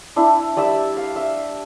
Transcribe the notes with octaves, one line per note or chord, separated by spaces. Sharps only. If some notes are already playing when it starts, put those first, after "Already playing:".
D4 E4
G3 D5 E5 E6
F5
E5